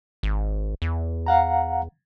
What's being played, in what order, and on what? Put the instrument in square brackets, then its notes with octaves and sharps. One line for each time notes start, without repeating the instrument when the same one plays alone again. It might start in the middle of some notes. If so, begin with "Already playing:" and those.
[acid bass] G#1
E2
[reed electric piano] F5 F#5 A#5